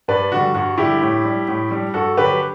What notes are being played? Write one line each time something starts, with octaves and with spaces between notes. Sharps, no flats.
G2 B4 D5
D3 G3 F#4
G2 F#4
D3 G3 E4 G4
A2
G3 D4
A2
G3 D4
G2 F#4 A4
D3 F#3 G4 B4